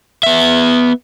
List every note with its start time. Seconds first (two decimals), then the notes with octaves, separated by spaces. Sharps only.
0.23 B3 E5